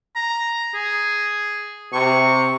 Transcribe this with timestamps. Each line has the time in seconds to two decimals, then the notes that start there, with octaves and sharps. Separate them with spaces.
0.16 A#5
0.74 G#4
1.93 C3 C#6